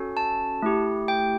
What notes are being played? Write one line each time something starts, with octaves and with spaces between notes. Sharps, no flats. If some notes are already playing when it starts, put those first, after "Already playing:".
Already playing: C#4 F#4 A4
A5
A3 E4 G4
G5